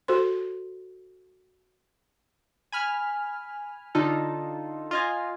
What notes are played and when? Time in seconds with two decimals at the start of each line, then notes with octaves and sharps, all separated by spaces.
0.08 F#4 A4 C5 C6
2.72 G#5 B5 F6
3.95 D3 D#4 F4 A4
4.91 F4 D#5 G#5